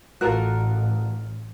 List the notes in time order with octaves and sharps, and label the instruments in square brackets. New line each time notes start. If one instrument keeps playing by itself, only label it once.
[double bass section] A1 [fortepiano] F4 A#4 F#6 [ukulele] F#4 A4